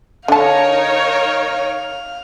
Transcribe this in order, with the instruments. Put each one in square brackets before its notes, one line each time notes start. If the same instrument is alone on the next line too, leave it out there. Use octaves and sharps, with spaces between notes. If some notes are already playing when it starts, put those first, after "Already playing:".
[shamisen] D3 A5 [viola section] D#4 A#4 C#5 [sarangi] F5